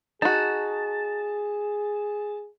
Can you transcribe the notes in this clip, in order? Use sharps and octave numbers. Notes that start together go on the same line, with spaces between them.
D#4 F#4 G#4 A5